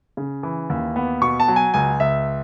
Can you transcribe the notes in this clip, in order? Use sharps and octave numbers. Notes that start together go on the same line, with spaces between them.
C#3
E3
D#2
B3
B2 C#6
A5
F#3
G#5
C#2 G#5
C#2 E5